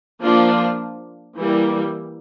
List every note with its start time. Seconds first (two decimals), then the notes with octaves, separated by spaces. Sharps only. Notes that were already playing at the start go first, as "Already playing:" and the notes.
0.21 F3 A#3 D4 F4
1.37 E3 G3 A#3